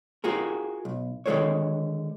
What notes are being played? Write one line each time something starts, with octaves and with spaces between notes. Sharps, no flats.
F4 F#4 G#4 A#4
B1
D3 D#3 G#3 A4 C5 C#5